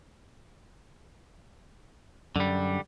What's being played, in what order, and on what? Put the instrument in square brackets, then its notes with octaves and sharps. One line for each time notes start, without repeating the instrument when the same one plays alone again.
[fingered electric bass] F#2 [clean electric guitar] D3 G3